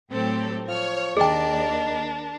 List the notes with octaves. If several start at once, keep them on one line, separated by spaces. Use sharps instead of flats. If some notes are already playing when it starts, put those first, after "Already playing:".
A2 F#3 C4 G4 A4
F3 C#5 F6
D#2 D4 D#4 G#4 A#4 D5 G5